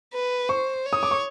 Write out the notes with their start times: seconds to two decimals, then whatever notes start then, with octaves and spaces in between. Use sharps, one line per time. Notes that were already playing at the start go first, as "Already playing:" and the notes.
0.14 B4
0.49 C5 C#6
0.85 C#5
0.93 D#6
1.03 D6
1.11 C#6